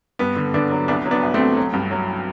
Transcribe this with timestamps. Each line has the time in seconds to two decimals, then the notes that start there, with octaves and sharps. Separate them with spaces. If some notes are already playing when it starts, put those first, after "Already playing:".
0.19 G2 B3
0.36 D3
0.54 D3 B3 D4
0.71 F#3
0.88 C2 B3 D4
1.06 F#3
1.11 B3 D4
1.23 C2
1.34 A3 C4
1.40 C2
1.57 F#3
1.73 G2
1.91 F#3